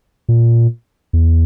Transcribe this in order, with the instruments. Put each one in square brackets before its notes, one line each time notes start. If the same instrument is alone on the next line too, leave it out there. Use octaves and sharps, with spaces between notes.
[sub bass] A#2
E2